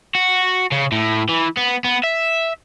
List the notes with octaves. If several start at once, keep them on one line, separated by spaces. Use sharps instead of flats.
F#4
C#3
A2
E3
B3
B3
E5